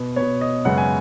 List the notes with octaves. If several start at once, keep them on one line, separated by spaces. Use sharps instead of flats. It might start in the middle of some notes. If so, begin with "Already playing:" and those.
Already playing: B2 B3
B2 B3 C#5
D#5
F#2 C#3 G#3 B3 F#5
G#5